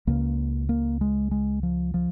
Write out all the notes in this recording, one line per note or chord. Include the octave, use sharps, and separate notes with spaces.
C#2 C#3 A#3
A#3
G#3
G#3
F3
F3